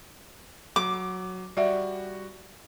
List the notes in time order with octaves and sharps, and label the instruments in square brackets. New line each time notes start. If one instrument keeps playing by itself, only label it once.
[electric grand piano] F#3 [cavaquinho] D6
[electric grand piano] G3 F#4 [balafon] D5 E5